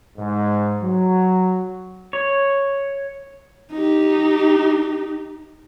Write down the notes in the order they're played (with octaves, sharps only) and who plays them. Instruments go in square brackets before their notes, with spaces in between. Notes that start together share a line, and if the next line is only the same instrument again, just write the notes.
[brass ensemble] G#2
F#3
[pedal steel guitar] C#5
[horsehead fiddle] D#4 G4